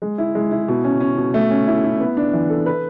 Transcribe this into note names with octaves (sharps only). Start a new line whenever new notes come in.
G#3
E4
G#3
E4
B2
C#4
C#4
B2
A3
C#4
E4
E4
B3
D4
E3
A4
B4